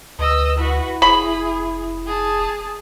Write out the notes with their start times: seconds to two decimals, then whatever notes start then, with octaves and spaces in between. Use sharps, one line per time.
0.19 D2 B4 D#5 E6
0.57 E4 F#4 B4
1.02 F1 G#4 B5
2.06 G#4 A5